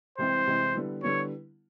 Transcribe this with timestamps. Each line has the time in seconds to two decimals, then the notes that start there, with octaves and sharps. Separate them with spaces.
0.18 C2 C3 E3 G#3 C4 C5
0.47 C2 C3 E3 G#3 C4
0.75 D3 G3 B3 E4
1.03 D3 G3 B3 E4 C#5